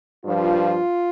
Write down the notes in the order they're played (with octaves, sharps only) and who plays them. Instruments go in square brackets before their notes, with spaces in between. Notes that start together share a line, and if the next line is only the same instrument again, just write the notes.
[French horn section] G2 F3 F4